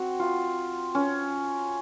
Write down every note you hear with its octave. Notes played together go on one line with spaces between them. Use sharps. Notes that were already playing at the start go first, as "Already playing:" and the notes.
Already playing: C4 F#4
F4
C#4